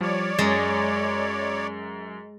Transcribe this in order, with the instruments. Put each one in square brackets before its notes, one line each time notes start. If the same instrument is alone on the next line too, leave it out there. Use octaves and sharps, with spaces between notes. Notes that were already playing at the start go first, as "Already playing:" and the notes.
[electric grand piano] F3 G3 [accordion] C#5 D5
[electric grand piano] F#2 A6 [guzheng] G#3